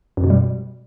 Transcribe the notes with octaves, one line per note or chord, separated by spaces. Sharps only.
F#2
B2
G3